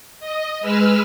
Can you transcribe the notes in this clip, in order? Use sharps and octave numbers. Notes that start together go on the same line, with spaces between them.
D#5
G#3 B4 E6 F6